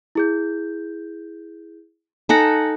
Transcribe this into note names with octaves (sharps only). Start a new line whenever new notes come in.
E4 G#4 G6
D#4 A4 F#5 G#5 A#6